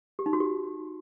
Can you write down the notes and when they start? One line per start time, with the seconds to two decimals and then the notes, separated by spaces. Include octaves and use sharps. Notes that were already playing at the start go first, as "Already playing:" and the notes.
0.19 G4
0.26 D#4
0.33 F#4
0.40 G4